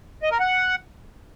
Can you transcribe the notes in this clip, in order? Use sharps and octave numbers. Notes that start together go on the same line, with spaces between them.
D#5
A#4
F#5